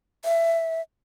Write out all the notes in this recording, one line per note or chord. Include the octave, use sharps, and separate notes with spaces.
E5